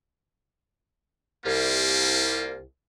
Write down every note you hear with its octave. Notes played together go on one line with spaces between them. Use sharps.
C2 G3 A#3 F4